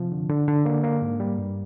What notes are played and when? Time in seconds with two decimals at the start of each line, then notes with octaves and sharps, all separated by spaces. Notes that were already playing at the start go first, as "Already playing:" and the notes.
Already playing: C3 F3
0.12 D3
0.29 D3
0.48 D3
0.65 A#3
0.83 A#3
1.01 G#2
1.20 G3
1.38 G2